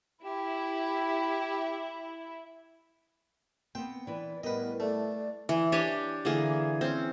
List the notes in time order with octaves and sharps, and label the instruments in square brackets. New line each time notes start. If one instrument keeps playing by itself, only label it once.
[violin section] E4 [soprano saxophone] G4
[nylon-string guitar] B3 C4 [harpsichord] G5
[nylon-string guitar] E3 B4 [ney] D5
[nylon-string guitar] A2 G3 [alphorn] B3 [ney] A#4 [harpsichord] B4 D#5
[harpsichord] A3 [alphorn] A4 [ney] D5
[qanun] E3
D4 G4 C#5 G#5
D3 E3 A#3 G#4
C4 C#4